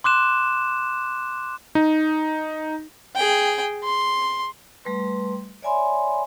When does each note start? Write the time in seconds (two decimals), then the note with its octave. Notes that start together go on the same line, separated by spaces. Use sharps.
0.04 C6 D6 F#6 E7
1.75 D#4
3.16 G#4 G5
3.83 C6
4.85 G3 A3 B4 C6
5.62 C#5 D5 E5 G#5 B5 C6